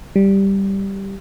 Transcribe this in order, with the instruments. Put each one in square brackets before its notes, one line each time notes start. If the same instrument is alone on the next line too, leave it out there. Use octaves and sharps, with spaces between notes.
[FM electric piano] G3